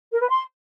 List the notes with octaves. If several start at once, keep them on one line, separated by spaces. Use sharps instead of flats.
A#4
B4
C6